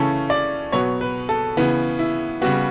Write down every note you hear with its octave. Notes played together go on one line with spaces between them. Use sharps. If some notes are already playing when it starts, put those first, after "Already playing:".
Already playing: C#3 E3 A3 C#4 A4
D5
B2 F#3 B3 C#5
B4
A4
C#3 E3 B3
E4
C#3 G3 B3 F#4